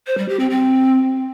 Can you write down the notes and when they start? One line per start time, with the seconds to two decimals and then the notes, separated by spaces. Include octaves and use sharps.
0.07 C5
0.18 G3
0.29 G4
0.39 C4
0.50 C4